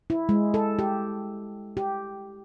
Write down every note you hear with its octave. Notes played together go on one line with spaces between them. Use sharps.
E4
G#3
A4
G4
G4